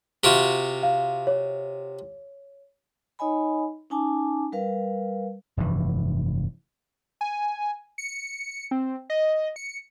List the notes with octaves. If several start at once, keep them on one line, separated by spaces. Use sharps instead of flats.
C3 F4 F#4 D7
F5
C#5
D#4 C#5 D#5 G#5 B5
C#4 D#4 G#5 A5 D6
G3 A#4 B4 F5
F1 G2 B2 E3
G#5
C#7
C4
D#5
C#7